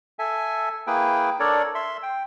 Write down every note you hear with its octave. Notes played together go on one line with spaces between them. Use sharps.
A4 E5 G#5
A#3 E4 G#4 B4 G5
D4 A4 A#4 C#5 D5
E5 C6
G5